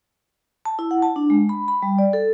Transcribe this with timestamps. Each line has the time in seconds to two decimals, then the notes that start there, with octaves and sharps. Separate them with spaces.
0.65 A5
0.79 E4
0.91 F#5
1.02 A5
1.16 D4
1.30 G#3
1.49 B5
1.68 B5
1.83 G3
1.99 D5
2.13 A4